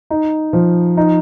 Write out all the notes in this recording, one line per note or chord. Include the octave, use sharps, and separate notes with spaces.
D#4
F3
D#4